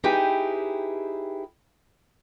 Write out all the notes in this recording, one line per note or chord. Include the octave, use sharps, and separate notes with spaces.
D#4 E4 G4 G#4 B4 G5